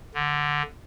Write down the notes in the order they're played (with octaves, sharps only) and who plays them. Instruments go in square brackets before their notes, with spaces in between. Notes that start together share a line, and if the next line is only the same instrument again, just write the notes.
[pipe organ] D3